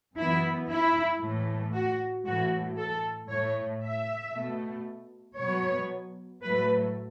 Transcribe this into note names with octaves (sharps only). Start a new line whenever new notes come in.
F#2 E3 B3 E4
E4
A2 E3 A3
F#4
A2 E3 A3 F#4
A4
A2 A3 C#5
E5
B2 A3
B2 F#3 B3 C#5
A2 F#3 A3 B4